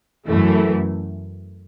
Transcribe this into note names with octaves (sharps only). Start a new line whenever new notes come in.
F#2 E3 A3